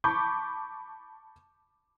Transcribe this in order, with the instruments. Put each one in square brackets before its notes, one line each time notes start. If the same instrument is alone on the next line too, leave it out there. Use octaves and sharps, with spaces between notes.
[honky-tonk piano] A5 B5 C#6 D6 G6